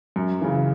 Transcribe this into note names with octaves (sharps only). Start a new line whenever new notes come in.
F#2
C#3 E3